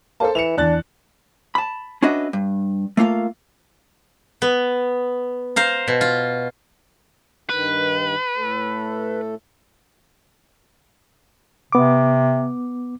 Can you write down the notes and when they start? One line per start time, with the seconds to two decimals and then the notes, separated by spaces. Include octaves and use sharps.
0.20 A#3 A4 C5 A5
0.35 E3 C#7 E7 F7
0.57 E2 D4 F#6 A6
1.55 A5 B5
2.02 C#4 D4 F#4 B4 D#5 E5
2.33 G2
2.97 A3 A#3 F4 F5
4.42 B3
5.56 C5 F5 A#5
5.88 B2
6.01 F4
7.50 G2 D#3 B4
8.37 A2 A3 A4
11.72 C3 B3 D6